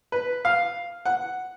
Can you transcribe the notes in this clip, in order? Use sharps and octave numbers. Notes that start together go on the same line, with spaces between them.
B4
F5
F#5